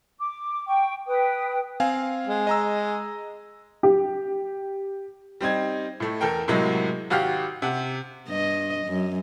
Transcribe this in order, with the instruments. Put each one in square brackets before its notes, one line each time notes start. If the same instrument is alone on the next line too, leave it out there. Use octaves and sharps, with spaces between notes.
[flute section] D6
G5 C#6
B4 G5 D#6
[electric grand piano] C4 F5 G#5
[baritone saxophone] G#3
[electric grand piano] D#5 A#5 E6
[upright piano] G4
G3 C4 D#4 G#6
A2 A3
E2 A4 A#4 G5
A2 C3 F#3 G#3 A#3
G#1 F#4 G4 F5 F6 G6
C3 F#5
[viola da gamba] G2 D#5
F#2